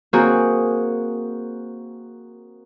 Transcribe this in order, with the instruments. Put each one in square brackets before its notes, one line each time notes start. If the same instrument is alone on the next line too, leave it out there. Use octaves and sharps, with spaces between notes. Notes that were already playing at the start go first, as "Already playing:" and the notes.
[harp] A#3 C4 F#4 G#4